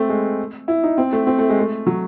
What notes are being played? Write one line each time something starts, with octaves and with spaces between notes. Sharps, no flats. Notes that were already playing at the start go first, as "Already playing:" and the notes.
Already playing: A3 C4
G#3
E4
D#4
C4
A3
C4
A3
G#3
A3
F#3